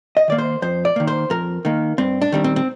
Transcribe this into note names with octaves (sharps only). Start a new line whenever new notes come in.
D#5
D#3 A#3 D5
C5
F2 C5
D5
D#3 A#3
C5
F2 A#4
D#3 A#3
G2 C4
D4
D#3 G3 C4
C4
C4